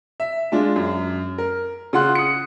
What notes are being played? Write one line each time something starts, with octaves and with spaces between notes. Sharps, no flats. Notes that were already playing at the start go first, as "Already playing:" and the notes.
E5
G#3 D4 F4
F#2
A#4
C#3 F4 F#5 C6 F#6
D#6 C#7